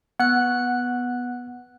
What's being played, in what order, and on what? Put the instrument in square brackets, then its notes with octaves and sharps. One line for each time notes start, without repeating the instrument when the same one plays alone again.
[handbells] B3 F#6 [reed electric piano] F#5